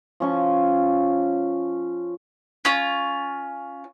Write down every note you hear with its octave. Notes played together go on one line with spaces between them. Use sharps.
F3 C#4 C#6
C#4 F4